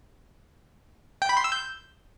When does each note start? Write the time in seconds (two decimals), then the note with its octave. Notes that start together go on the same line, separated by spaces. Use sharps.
1.22 G5
1.29 B5
1.37 C6
1.44 E6
1.52 G6